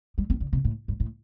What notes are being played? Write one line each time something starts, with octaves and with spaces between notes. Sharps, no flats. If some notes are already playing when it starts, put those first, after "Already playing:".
G3
C4
D3
C3
A2
G2
A2